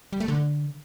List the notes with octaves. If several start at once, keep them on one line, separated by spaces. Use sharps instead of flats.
G3
A3
D3